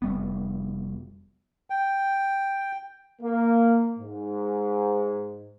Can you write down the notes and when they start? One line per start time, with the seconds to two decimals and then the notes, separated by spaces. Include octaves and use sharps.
0.02 F1 G3 B3
1.70 G5
3.22 A#3
3.99 G#2